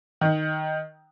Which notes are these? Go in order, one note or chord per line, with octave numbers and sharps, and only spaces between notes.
D#3